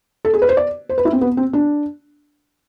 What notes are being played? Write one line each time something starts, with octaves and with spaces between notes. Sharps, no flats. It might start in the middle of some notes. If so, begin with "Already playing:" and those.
A4
G#4
B4
C5
D5
C5
B4
E4
C4
B3
C4
D4